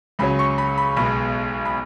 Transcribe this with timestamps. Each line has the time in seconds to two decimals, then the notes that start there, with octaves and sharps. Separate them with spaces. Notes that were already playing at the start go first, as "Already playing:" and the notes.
0.19 C#2 C#3 F#3 C#4 B5
0.39 C#6
0.58 B5
0.78 B5
0.96 B1 B2 G#3 B5
1.65 B5